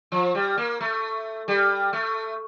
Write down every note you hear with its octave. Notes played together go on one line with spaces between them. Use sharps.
F3
G3
A#3
A3
G3
A3